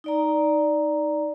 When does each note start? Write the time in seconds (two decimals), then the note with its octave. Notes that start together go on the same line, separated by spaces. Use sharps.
0.04 D#4 D5 A#5